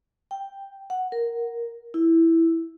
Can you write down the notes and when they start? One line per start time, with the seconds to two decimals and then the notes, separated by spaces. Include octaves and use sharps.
0.31 G5
0.90 F#5
1.12 A#4
1.94 E4